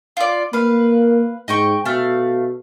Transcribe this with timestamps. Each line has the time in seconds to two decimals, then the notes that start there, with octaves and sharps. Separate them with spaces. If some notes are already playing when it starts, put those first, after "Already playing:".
0.17 F4 D5
0.53 A#3 B4 F5
1.48 G#2 D#5 G5 C#6
1.85 B2 A3 F5